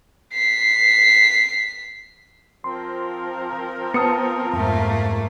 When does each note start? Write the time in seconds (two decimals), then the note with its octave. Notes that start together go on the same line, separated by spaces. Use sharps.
0.34 B6 C7
2.64 F3 C4 A#4 C6
3.94 B3 A5 D#6 C#7
4.53 F2 G#2 A3 A#3